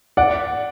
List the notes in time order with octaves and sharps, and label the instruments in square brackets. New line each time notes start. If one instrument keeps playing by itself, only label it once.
[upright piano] D5 F#5